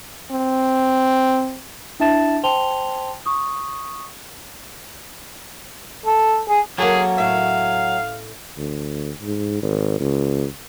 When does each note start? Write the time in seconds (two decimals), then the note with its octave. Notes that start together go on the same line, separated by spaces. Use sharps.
0.32 C4
2.00 D4 E4 E5 A5 A6 E7
2.44 C5 G5 A5 C6 F7 G7
3.26 C#6 D#6
6.06 A4
6.49 G#4
6.78 F#3 A#3 C#4 G#4 A4
7.18 A2 E5 F5
8.57 D2
9.22 G#2
9.63 G#1
10.00 C#2